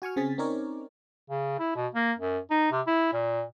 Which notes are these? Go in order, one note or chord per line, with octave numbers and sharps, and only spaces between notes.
F#4 G#5 C#6 F6
C#3 C4 G#4 G#5 A6 B6
C4 C#4 D#4 A#4 C#5 D5
C#3
E4
B2
A#3
F#2
D#4
C3
E4
A#2